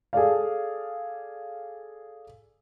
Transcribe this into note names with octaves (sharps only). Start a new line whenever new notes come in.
G#4 A4 D5 F5